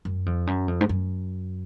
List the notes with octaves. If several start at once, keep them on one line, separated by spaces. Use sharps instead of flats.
F#2
F2
F#2
F2
G#2
F#2